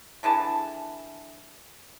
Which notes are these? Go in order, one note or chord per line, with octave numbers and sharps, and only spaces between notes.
D3 E3 G#4 A5